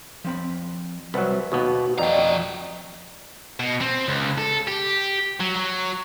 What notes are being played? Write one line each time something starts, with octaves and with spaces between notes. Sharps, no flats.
F3 C4 B5
C2 F#3 B4 F#5
D#2 B2 B3 F#4
F2 F3 D5 D#5 G5 A#5
B2
C4
C#2
A4
G4
F#3
F#3